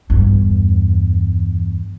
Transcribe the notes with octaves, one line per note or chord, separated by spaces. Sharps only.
E2 G2